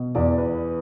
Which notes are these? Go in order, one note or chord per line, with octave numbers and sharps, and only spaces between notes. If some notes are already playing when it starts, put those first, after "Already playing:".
Already playing: B2
E2 D5
B4